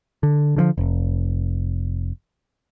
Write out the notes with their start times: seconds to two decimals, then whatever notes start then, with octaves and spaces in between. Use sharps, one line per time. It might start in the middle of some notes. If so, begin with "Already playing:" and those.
0.23 D3
0.56 D3 D#3 F3
0.78 F1